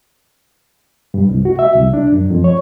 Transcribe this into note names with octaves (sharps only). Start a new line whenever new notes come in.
G2
C2
F#4
E5
C2
D4
F#2
F2
C#5